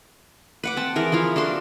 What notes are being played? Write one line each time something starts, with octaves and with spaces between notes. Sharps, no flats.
B4 F#5 D6
C4 A5
E3 G#4 A#4
F3 E4 F4 F5
D4 F#4 A4 C6